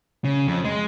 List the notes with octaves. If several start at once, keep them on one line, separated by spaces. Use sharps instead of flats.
C#3
F2
G#3